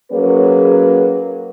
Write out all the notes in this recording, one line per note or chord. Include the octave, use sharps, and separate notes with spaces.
F#3 A#3 C#4 G#4 B4